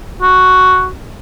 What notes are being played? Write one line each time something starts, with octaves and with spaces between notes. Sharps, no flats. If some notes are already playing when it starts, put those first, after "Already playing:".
F#4